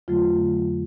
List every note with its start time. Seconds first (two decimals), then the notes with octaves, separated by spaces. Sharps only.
0.08 F2 D3 F#3 A3 F4